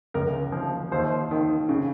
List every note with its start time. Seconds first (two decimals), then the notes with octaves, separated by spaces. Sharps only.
0.14 C#2 A#4
0.52 F3
0.92 D#2 C5
1.31 D#3
1.69 C#3